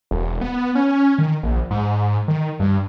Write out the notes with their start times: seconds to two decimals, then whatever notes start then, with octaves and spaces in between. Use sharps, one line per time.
0.11 E1
0.41 B3
0.75 C#4
1.18 D#3
1.43 A#1
1.70 G#2
2.28 D#3
2.60 G2